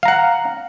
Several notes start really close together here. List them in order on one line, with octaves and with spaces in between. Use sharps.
F5 A#5 F#5